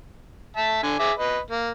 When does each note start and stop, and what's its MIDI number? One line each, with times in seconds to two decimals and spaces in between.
0.57 0.81 76
0.57 0.81 81
0.83 0.95 50
0.83 0.95 80
0.99 1.12 68
0.99 1.12 76
0.99 1.12 86
1.18 1.39 71
1.18 1.39 75
1.51 1.70 58